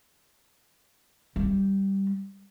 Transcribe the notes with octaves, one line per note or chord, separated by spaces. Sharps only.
G3